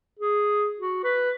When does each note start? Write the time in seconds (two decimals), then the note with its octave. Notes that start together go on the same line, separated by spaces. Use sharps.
0.19 G#4
0.80 F#4
1.04 B4